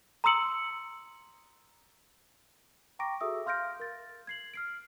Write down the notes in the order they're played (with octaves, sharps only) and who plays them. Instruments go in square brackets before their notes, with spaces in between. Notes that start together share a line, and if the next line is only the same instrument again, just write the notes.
[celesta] A#5 C6 D#6 E6 C#7 F#7
G5 A#5 C#6 D6 A#6 D7
F#4 G#4 A4 E5 D#6 E6
F5 C6 F6 G6 A#6 D7
A#4 A6
G#6 C7 F#7
F6 C7 D7